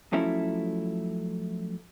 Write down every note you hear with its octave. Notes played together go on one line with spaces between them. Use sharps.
F3 F#3 A3 C#4 E4